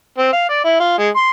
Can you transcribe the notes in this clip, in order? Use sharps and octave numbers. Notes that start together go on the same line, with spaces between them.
C4
F5
D5
E4
F4
G#3
C6